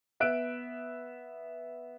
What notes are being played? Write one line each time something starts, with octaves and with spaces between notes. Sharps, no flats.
B3 E5 F#6 D7